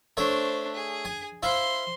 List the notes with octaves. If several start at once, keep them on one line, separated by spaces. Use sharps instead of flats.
A3 D4 C5 C#5 E5
G#4
G#5
E4 C5 E5 F5 C6